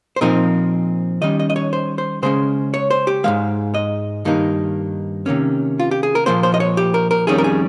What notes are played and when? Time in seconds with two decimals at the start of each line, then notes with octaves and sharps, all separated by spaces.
0.16 C5
0.21 A#2 F3 C4 D#4 A#4
1.22 D#3 G3 C#4 D#5
1.39 D#5
1.50 D#5
1.56 C#5
1.73 C5
1.98 C5
2.23 C#3 G#3 C#4 C5
2.74 C#5
2.90 C5
3.07 G4
3.24 G#2 F3 G#3 F5
3.74 D#5
4.25 G2 D#3 A#3 D#4
5.26 C3 D#3 A#3 C#4
5.80 F4
5.91 G4
6.03 G#4
6.15 A#4
6.26 A#2 F3 A#3 C5
6.43 C5
6.54 D#5
6.60 C#5
6.77 G4
6.94 A#4
7.11 A#4
7.27 F2 D#3 G3 C#4 G#4
7.38 A#4
7.44 G#4